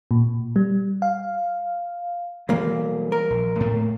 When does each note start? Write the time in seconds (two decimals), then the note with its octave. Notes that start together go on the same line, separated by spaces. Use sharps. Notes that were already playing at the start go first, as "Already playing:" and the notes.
0.11 A#2
0.56 G3
1.02 F5
2.49 B1 E3 G3 G#3 A#3
3.12 A#4
3.30 A#1
3.60 A2 A3 A#3